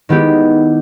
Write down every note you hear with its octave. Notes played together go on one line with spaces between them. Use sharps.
D#3 G#3 B3 E4 G4